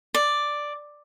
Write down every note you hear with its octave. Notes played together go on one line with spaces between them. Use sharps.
D5